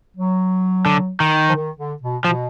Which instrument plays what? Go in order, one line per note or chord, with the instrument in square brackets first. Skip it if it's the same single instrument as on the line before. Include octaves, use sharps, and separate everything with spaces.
[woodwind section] F#3
[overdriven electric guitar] D3
D#3
[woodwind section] F3
D#3
D3
B2
[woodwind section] B2 [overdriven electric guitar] F3